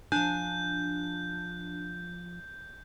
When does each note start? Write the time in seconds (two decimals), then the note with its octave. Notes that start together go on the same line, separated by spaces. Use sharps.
0.12 F3 D4 G#5 G6